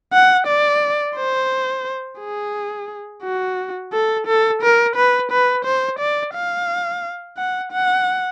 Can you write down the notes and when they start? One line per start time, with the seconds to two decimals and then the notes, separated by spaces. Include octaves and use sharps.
0.13 F#5
0.47 D5
1.16 C5
2.20 G#4
3.23 F#4
3.93 A4
4.27 A4
4.62 A#4
4.96 B4
5.31 B4
5.65 C5
5.99 D5
6.34 F5
7.37 F#5
7.72 F#5